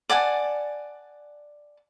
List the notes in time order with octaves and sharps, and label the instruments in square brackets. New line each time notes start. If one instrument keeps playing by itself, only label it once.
[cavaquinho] D5 F#5 G#5 A5